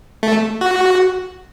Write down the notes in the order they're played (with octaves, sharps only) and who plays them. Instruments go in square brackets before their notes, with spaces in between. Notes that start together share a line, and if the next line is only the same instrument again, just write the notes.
[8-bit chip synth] A3
F#4